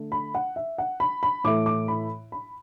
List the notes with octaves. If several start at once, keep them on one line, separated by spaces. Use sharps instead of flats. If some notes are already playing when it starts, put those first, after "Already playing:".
Already playing: D3 A3 D4
B5
F#5
E5
F#5
B5
B5
A2 E3 A3 E4 D6
D6
B5
B5